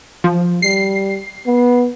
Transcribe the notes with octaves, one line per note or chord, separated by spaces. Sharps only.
F3
G3 C7
B3